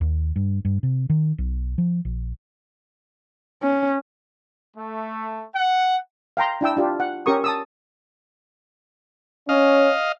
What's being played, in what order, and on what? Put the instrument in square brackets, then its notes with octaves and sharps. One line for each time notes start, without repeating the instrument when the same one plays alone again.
[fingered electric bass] D#2
G2
G2
C3
D#3
B1
F3
A#1
[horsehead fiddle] C#4
[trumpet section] A3
F#5
[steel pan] F5 G5 A#5 C6
D4 E4 G5 E6
D4 F4 G4
F#5
C#4 G4 A#4 C#6 D#6
A5 D#6 E6
[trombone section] C#4 [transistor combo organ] D#5 F5